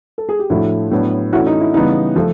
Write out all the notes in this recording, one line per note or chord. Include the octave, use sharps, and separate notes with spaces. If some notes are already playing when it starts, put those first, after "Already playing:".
A4
G#4
G4
A2 F3 A3 D4 E4 F#4
A2 F#3 B3 D4
E3 A3 C#4 E4 F#4
D#4
E4
C#3 E3 G3 B3 D#4
F3 A3